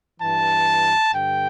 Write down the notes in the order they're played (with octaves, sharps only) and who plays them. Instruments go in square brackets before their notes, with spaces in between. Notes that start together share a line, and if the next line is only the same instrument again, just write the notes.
[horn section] G2 E3 A5
G2 D3 G5